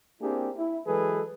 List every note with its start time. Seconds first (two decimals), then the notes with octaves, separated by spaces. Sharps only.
0.21 A#3 C4 D4 E4 G4 G#4
0.57 E4
0.87 E3 F#3 G#3 G#4 A4 B4